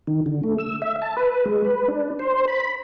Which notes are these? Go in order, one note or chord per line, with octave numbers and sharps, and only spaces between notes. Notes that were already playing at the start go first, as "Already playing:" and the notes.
D#3
D3
A3
E6
E5
A5
B4
G#3
B4
D4
C5
B5